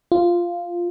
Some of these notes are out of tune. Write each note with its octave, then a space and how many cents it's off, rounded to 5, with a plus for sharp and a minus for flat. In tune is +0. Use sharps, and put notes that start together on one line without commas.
F4 -5